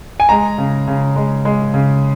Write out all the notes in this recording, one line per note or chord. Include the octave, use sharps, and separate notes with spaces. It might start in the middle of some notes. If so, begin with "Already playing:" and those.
G#5
G#3 A#5
C#3
C#3
G#3
G#3
C#3